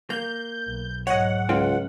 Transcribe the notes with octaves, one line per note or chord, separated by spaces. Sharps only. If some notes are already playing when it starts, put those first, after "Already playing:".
A#3 G6
B1
G#2 F#3 C#5 D#5 F#5
C#2 F4 F5 G5